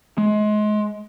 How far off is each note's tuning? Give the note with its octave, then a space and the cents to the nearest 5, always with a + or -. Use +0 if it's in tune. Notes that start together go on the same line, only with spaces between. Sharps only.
G#3 +30